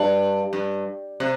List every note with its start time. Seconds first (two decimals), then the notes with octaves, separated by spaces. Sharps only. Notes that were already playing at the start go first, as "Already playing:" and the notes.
Already playing: G2
0.53 G2
1.20 C3